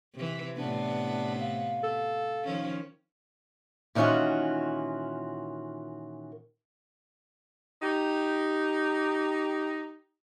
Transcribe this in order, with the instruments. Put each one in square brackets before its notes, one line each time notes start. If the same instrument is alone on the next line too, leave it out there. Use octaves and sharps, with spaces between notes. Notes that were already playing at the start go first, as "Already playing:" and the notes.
[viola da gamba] C3 E3
[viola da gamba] A2 C3 B3 [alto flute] D4
[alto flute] F5
[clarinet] A4
[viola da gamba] D#3 F3 C#4
[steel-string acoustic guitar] A#2 D#3 E3 C#4 F4 F#4
[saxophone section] D#4 G4